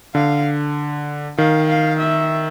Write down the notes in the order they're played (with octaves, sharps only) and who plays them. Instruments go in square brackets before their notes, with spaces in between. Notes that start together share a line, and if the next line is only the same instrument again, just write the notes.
[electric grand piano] D3 [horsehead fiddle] F5
[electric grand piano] D#3 [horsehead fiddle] F5
[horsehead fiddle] F5
E5